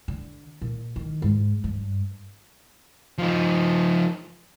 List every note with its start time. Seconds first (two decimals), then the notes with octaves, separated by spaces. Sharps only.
0.08 D3
0.62 A#2
0.96 D#3
1.22 G#2
1.64 G2
3.18 F3 D#4